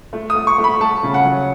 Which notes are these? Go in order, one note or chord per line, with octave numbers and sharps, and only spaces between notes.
A3
D#6
A3
C#6
A3
B5
A3 A5
C#3
F#5
F#3